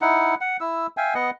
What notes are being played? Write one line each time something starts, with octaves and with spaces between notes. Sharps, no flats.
D#4 E4 F#5
F#5
E4 E6
E5 F5 G5 G#5
B3 D#5 F#5